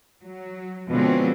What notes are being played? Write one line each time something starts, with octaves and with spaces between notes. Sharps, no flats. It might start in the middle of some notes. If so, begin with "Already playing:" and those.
F#3
B2 D3 F3 G#3 C4 C#4